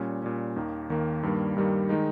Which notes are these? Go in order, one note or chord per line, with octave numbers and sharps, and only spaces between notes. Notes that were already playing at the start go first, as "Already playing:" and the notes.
Already playing: A#2 G3 C#4
A#2 G3 C#4
D#2 D#3 A#3
D#2 D#3 A#3
G2 D#3 G3 A#3
G2 D#3 G3 A#3
D#3 G#3 D#4